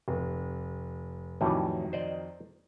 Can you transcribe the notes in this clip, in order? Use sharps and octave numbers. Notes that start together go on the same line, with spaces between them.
F1
F2 A2 D#3 E3 F#3 G3
C5 D5 D#5